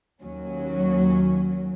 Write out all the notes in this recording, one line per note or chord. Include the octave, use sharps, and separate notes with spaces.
D#2 F#3 C#4